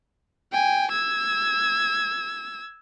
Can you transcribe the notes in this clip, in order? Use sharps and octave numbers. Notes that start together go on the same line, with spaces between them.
G5 G#5
E6 G#6